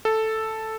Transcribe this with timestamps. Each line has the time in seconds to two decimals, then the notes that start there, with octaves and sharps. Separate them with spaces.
0.05 A4